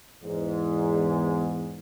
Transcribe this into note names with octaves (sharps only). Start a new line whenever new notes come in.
E2 G#2